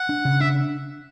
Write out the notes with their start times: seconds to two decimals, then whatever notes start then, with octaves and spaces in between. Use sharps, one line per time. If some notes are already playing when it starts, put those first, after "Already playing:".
Already playing: F#5
0.09 D4
0.25 C#3
0.41 D4 E5